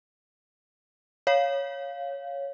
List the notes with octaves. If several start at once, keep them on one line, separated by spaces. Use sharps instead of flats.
C#5 F5